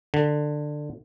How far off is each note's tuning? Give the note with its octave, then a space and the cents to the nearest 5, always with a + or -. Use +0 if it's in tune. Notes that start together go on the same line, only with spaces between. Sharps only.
D3 +15